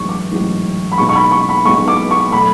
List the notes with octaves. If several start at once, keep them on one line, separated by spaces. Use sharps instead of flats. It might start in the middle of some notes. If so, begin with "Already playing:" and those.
Already playing: A1 G#2 F#3 C#6
D6
A1 G#2 F#3
B5
B1 B2 G#3 C#6
C#6
B5
C#6
B5
B1 B2 G#3 C#6
D6
C#6
B2 F#3 A3 B5